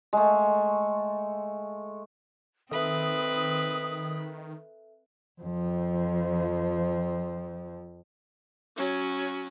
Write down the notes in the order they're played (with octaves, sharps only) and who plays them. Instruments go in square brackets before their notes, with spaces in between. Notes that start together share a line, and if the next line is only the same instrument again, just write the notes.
[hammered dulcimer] G#3 A3
[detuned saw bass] D#3 [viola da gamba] C4 B4 [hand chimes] A4 E5 [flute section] D#6
[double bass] F2 F3
[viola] F#3 C#4